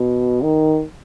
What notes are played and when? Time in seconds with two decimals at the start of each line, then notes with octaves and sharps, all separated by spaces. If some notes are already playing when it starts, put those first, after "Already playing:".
Already playing: B2
0.43 D#3